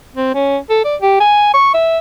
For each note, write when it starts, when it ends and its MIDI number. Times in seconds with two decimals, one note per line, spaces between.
0.15 0.33 60
0.35 0.57 61
0.69 0.80 69
0.84 0.95 74
1.01 1.17 67
1.20 1.53 80
1.54 1.70 85
1.74 1.98 76